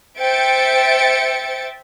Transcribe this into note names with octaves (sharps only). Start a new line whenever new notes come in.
C5 E5 G5 A6 C#7 D7